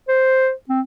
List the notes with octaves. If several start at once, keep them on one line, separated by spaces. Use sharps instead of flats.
C5
C4